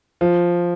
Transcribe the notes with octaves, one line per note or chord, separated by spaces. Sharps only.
F3